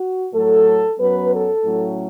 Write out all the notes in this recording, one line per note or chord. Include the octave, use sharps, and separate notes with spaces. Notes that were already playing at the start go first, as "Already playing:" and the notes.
Already playing: F#4
A2 F#3 A3 A4
F#2 F#3 B3 B4
A4
A2 F#3 A3 C#4